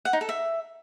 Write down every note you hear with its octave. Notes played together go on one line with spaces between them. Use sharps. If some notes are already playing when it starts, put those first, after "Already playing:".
F#5
D#4
A4
E5